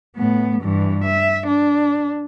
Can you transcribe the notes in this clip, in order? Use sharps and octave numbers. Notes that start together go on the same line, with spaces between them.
A2 B3
G2 E3
E5
D4